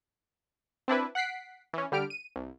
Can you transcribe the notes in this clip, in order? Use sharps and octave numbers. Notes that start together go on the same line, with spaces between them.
C4 D4 E4 B4
F#5 F#6 B6 C7 D7
E3 C#4
D3 G3 G4 F6 D7
D#7
C2